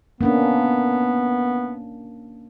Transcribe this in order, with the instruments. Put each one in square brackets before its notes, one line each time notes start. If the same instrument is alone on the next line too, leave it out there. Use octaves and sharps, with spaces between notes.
[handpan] A#3 C#4 D4 [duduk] B3